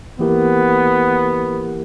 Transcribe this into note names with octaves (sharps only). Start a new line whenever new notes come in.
E3 A#3 B3 E4 G4 A#4